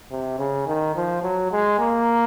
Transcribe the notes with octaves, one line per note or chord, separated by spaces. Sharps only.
C3
C#3
D#3
F3
F#3
G#3
A#3